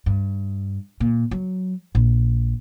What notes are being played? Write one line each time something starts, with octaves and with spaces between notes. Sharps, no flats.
G2
A#2
F#3
A#1